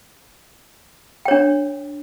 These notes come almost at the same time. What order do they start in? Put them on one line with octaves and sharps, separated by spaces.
G5 C#5 D4